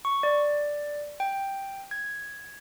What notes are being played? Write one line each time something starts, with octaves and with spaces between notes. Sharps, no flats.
C#6
D5
G5
G#6